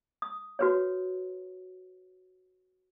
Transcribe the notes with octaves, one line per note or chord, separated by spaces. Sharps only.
D#6
F#4 B4 C#5